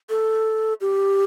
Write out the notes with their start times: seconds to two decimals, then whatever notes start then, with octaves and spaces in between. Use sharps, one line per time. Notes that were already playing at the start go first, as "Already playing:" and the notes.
0.10 A4
0.81 G4